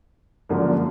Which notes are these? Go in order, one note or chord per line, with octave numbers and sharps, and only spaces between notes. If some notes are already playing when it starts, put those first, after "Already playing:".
G#1 F#2 D3 F3 A#3